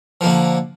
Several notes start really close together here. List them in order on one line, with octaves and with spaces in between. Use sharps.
F3 A#3 D3